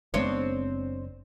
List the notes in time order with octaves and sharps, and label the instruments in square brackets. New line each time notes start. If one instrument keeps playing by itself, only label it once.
[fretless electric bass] F#1 G#3 B3 [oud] C4 D4 C#5